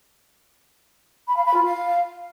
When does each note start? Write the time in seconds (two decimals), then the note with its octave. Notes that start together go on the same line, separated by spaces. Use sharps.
1.28 B5
1.36 F5
1.45 B5
1.54 F4
1.63 F5